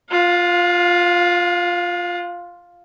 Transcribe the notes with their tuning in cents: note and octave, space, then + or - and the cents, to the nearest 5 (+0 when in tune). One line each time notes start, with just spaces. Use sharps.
F4 +5 F#5 -45